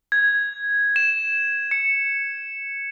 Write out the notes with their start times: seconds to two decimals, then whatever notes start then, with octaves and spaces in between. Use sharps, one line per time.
0.12 G#6
0.96 E7
1.71 C#7